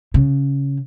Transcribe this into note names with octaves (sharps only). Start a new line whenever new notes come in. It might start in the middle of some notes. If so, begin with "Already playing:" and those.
C#3